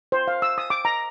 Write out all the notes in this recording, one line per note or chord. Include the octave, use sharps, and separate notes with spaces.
C5
F5
E6
D#6
D6
A#5